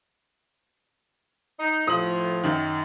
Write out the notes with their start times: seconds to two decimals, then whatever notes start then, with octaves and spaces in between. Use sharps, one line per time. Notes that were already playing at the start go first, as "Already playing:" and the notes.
1.60 D#4
1.87 A2 F3 D#6 F#7
2.43 F#2 D#3